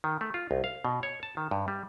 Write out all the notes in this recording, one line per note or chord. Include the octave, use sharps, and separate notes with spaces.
D#3
A3
F4
C2
F5
B2
C#5
A5
D#3
G2
G3